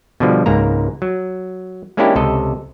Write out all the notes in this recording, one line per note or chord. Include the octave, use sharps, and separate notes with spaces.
B2 D3 F3 G3
C#2 G#2 A#3 A#5
F#3
G#3 A#3 C#4 D4 E4 G4
C#2 C3 A4 D#5